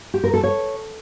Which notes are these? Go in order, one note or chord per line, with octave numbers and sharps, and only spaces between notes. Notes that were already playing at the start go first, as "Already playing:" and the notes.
G4
A#4
A4
C#5